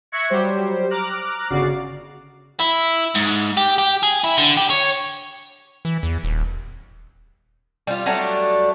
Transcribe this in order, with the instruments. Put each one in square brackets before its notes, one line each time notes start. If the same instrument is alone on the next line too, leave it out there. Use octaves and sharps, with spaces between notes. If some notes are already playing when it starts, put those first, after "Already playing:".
[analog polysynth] E5 C#6 F#6 G#6 A#6 C#7
F#3 G3 G4 C5
A#5 D6 F6 F#6 A#6
G1 C#3 F#4 D5 D6 C7
[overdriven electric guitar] E4
G#2
G4
G4
G#4
E4
D3
G4
C#5
[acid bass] E3
E2
D#1
[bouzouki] G3 F4
F#3 G3 A3 D4